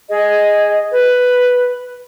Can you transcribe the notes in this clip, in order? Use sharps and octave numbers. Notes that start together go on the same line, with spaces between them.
G#4 D#5
B4